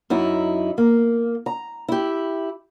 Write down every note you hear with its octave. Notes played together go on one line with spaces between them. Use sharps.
F#2 D#4 E4
A#3
A#5
E4 G4